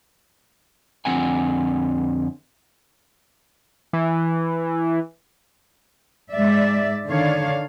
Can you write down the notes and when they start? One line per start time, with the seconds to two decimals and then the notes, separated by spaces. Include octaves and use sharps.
1.05 F2 D3 C4 F#5 G#5
3.93 E3
6.31 G#2 G#3 D5 E5
7.09 D3 D#3 D4 C#5 F5